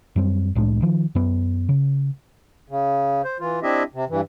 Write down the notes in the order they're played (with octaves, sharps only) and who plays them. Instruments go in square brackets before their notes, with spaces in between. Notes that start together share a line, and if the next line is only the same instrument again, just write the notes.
[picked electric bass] F#2 G3 C4
C2 A2 G#3 D4
D#3 F3
F#2 B3
C#3
[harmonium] C#3
C5
E3 F4
C4 D4 E4 G4 D#5 E5
C3
G2 E3